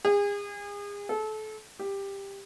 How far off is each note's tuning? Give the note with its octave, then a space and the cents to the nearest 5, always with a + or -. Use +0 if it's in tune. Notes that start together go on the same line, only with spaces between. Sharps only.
G#4 -35
A4 -30
G4 +10